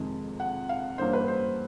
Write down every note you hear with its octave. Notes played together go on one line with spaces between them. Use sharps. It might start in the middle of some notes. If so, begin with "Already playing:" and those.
Already playing: F2 C3 D#3 G#3
F#5
F5
G2 E3 G3 A#3 C#4 C5
B4
C5